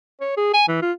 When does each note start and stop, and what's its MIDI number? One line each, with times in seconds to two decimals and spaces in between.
0.21 0.34 73
0.37 0.50 68
0.54 0.63 80
0.68 0.77 52
0.82 0.92 65